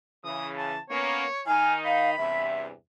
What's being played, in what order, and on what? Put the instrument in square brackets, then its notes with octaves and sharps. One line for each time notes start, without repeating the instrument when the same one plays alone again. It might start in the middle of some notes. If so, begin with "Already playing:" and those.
[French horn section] C#3 E3 [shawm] D#6
[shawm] A5
[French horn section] A#3 B3 C#4 [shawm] C#5
[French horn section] D#3 D#4 [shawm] F5 [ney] G#5
[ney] F5 [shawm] B5
[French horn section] E2 G2 C3 [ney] E5